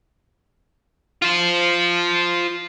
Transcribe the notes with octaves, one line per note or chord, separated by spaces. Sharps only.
F4 C5